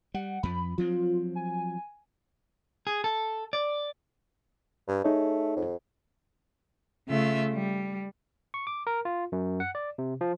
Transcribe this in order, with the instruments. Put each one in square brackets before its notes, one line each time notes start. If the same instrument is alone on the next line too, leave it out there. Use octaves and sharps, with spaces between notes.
[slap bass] G3 [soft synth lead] F#5
[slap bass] F2 F3 [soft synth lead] B5
[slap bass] F3 F#3 C4 [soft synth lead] F4
[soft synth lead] G#5
[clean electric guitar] G#4
A4
D5
[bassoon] G2
[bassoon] A3 [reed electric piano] D#4 G#4 C#5
[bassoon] F2
[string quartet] C#3 A3 F4 E5
G3
[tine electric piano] C#6
D6
A#4
F4
F#2
F#5
D5
C3
F3